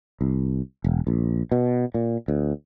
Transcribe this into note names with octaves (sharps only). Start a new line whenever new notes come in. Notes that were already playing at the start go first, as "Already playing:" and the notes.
C2
E1
A#1
B2
A#2
D2